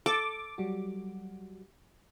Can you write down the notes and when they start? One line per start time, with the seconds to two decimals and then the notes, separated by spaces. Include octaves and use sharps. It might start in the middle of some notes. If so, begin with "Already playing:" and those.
0.06 A4 D6
0.58 F#3 G3 F#4